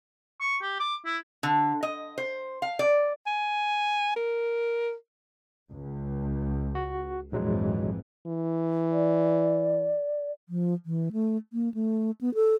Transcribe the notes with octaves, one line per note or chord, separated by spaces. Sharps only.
C#6
G4
D6
E4
D3
D#5
C5
F5
D5
G#5
A#4
C#2
F#4
A#1 F2 G#2 E3 F#3 G#3
E3
D5
F3
E3
A3
A#3
A3
B3
A4